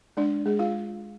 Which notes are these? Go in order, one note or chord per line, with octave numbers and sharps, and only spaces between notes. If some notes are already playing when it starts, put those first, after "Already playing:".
G#3 D4 D5
G#3 G#4
F4 F5